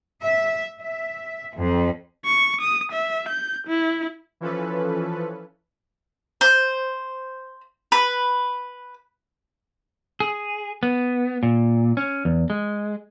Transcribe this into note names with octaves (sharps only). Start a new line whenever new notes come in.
E5
E5
F2
C#6
D#6
E5
G6
E4
E3 F3 C#4 A4 B4
C5
B4
G#4
B3
A#2
C#4
E2
G#3